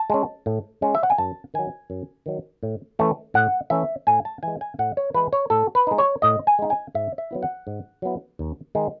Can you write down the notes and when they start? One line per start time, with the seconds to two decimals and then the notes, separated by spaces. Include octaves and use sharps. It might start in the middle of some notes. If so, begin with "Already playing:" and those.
Already playing: A5
0.10 G#3 C#4
0.46 A2
0.82 G#3 C#4
0.95 E5
1.03 F#5
1.10 G#5
1.18 F#2 A5
1.54 D#3 F#3 G#5
1.90 F#2
2.26 D#3 F#3
2.63 A2
2.99 E3 A3 C#4
3.34 A2 F#5
3.70 E3 A3 C#4 E5
4.07 A2 G#5
4.25 A5
4.43 E3 G#3 G#5
4.61 G#5
4.79 A2 F#5
4.97 C#5
5.14 E3 G#3 B4
5.33 C#5
5.50 A2 A4
5.75 B4
5.87 G#3 D#4
5.98 C#5
6.22 A2 D#5
6.47 G#5
6.59 G#3 D#4
6.70 G#5
6.95 G#2 E5
7.18 E5
7.31 F#3 B3 E4
7.43 F#5
7.67 G#2
8.02 F#3 B3 E4
8.39 D#2
8.75 D#3 G#3 D#4